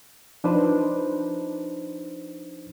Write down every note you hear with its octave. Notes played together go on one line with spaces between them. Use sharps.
F3 D4 D#4 B4 C5